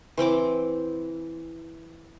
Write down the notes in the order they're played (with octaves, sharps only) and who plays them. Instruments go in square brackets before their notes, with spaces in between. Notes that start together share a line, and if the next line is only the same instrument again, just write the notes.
[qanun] E3 C4 G5 D6